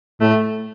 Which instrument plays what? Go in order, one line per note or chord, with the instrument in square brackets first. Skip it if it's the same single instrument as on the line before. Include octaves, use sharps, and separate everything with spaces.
[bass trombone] A2 [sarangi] A3